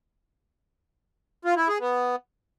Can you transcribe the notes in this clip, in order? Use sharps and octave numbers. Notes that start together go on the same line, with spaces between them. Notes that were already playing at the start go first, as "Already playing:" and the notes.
F4
E4
G#4
B3